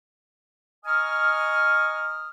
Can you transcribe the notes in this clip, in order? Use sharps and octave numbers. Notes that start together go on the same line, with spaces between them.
D#5 G#5 A#5 C#6 D#6 F6